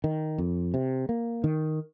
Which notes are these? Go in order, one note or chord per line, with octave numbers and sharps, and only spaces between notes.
D#3
F2
C3
A#3
D#3